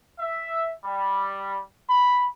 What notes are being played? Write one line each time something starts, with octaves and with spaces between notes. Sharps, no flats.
E5
G3
B5